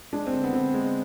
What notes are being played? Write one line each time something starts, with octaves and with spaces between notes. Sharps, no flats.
G#3 D4
C4
D3
B3
D3 C4
G#3